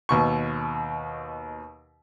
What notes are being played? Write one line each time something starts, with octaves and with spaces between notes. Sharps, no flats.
D#2 B2 C#6